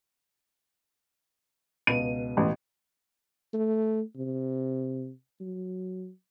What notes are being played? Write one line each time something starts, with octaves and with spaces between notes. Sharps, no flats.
C#2 B2 D#7
A1
A3
C3
F#3